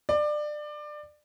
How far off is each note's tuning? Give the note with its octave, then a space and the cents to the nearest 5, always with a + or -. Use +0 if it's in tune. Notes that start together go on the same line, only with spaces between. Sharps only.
D5 +25